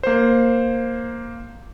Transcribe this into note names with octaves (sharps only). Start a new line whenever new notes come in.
A#3 C5